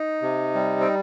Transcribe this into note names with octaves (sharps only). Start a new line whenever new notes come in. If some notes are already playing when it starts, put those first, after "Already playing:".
Already playing: D#4
C3
G3
C4